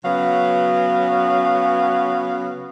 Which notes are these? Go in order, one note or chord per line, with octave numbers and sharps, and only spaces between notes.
C#3 F#3 B3 F5